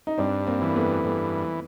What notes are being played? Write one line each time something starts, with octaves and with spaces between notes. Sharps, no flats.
D#4
G2 C4 D4
A#3 C4
E3
A#3
A3 B3
G2 A3 B3